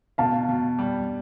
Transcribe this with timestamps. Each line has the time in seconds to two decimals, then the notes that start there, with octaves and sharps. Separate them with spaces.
0.18 B2 F5 A5
0.49 B2
0.79 G3